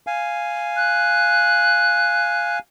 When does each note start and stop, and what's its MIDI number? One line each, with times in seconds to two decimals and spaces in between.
0.07 2.59 77
0.07 2.59 80
0.76 2.57 90